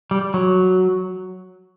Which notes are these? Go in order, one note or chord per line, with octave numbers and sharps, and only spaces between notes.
G3
F#3